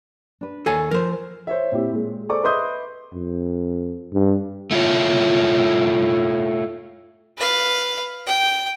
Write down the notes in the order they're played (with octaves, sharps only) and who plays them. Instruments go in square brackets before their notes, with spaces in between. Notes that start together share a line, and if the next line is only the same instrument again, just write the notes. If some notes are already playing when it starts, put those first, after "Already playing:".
[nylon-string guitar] D4 B4
[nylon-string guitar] D#2 [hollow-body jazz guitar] A4 C#5 G#5
[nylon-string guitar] F3 [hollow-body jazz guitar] A#4 C5
[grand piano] C5 C#5 E5
A#2 C4 E4 G4
A#2 G#3
G#4 A4 C5 D5 C#6 D6
B4 D#5 E5 C6 D#6 G6
[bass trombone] F2
G2
[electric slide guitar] A3 E4 F4 C#5
[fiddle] B4 F5
G5